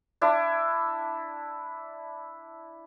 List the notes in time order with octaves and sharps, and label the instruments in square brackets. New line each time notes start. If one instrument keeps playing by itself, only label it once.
[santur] D4 E4